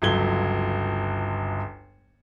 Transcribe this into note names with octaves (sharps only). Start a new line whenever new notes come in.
G1 C#2 F#3 G#6 G7